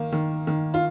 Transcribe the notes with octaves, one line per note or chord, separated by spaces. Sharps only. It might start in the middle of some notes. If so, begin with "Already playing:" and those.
Already playing: D#3 A#3
D#3
D#3
F4